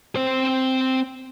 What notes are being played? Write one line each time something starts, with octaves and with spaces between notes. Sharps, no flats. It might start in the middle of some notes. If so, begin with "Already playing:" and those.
C4 C5